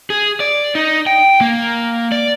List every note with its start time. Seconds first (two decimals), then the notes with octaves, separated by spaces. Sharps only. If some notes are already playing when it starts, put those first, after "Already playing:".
0.10 G#4
0.40 D5
0.75 D#4
1.07 G5
1.41 A#3
2.12 D5